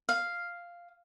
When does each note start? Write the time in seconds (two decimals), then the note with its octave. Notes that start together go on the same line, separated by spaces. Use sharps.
0.09 F5